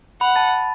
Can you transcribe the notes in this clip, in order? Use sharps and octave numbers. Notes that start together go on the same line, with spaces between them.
F#5 B5
A5 A6